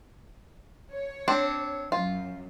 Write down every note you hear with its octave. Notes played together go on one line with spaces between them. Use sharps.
C#5
C4 D4
F#2 F4